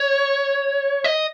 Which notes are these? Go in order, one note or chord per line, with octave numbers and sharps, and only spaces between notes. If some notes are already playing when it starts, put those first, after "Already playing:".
Already playing: C#5
D#5